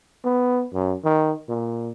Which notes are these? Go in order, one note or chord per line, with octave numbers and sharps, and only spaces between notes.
B3
F#2
D#3
A#2